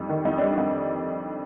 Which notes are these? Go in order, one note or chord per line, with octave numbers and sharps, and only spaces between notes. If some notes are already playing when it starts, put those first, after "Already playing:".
Already playing: F2 G3 D#4
D#3
F2 D#4
G3 D4
D#4
F2